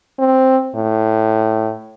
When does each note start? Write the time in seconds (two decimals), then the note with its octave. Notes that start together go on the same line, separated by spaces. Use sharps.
0.18 C4
0.75 A2